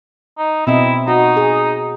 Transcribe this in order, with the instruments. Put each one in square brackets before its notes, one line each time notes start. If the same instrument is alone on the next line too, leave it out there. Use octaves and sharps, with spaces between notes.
[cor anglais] D#4
[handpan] B2 C4 D#5 [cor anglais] E4
[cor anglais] D#4 [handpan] F#4
[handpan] G#4